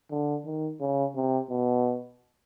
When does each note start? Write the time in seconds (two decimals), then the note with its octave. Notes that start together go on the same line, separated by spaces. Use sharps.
0.11 D3
0.45 D#3
0.81 C#3
1.16 C3
1.50 B2